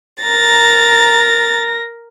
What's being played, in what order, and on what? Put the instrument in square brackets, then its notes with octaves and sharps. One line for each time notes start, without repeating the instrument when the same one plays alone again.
[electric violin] A#4 A#6 [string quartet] A#5 A6